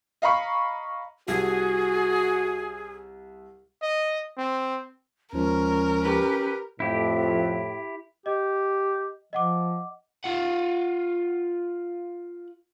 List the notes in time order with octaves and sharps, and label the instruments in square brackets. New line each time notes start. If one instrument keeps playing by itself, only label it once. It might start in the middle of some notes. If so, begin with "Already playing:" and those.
[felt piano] D#5 F5 A#5 B5 C#6
[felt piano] C2 [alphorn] F#4 [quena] G#4
[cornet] D#5
C4
[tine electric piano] D#2 F3 G#3 [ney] C#4 [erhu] A#4
[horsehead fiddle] G4 B4
[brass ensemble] F2 [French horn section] A2 [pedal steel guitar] E4 G4 [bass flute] E5
[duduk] G4 [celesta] D#5
[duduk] F3 [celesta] D#5 F#5 D6
[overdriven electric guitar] F4 F#5